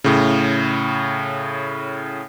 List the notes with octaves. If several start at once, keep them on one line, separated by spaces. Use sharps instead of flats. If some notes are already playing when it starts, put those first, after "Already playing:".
A2 C#3